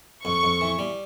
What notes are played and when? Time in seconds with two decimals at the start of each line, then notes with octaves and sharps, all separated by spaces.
0.25 F2 C#6
0.43 F2
0.61 E3
0.79 G3